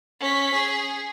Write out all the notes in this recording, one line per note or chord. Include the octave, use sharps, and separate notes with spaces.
C#4 B6
G#4